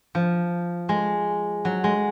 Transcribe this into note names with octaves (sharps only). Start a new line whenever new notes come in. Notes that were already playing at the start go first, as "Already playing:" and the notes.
F3
G#3
F#3
G#3